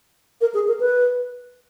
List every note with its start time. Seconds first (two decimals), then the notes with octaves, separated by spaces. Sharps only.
0.41 A#4
0.54 G#4
0.68 A#4
0.80 B4